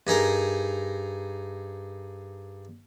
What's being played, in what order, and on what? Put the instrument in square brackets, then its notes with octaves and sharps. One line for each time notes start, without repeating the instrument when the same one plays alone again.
[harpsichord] G2 D#4 G#4 A#4